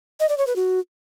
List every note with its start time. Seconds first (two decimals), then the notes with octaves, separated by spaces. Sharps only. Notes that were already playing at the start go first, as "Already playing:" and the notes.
0.20 D#5
0.29 D5
0.38 C#5
0.47 B4
0.56 F#4